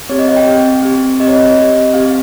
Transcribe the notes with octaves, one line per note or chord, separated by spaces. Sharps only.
C4 G4 C#5
D#5
F5
G5
C4 G4
C4 G4
C4 G4 D#5
C#5
D#5
C4 G4
C4 G4 F5